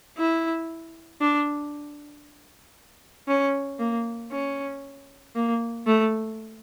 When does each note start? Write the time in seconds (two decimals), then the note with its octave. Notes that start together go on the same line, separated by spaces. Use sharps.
0.18 E4
1.21 D4
3.28 C#4
3.79 A#3
4.31 C#4
5.35 A#3
5.87 A3